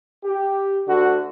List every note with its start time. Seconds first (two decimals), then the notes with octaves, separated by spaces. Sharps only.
0.24 G4
0.88 D2 D3 F#4